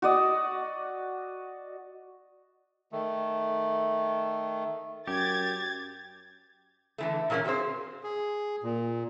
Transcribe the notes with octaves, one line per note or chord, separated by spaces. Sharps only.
F#4 D5 D#5
D#3 A3
F#2 G4 G#6 A6
D3 E3 A3
A#2 E3 A#3 B3 C#4
F#3 C4 F#4 G#4 C5
G#4
A#2